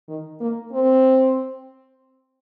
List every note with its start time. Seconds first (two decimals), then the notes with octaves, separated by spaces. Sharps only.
0.08 D#3
0.40 A#3
0.73 C4